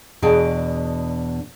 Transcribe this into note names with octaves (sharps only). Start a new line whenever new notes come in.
E2 B2 D4 G#4 G5 G#5